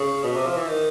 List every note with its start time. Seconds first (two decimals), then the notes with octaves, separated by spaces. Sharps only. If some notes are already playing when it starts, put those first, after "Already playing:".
Already playing: C#3
0.24 B2
0.36 C3
0.46 F3
0.57 E3
0.68 D#3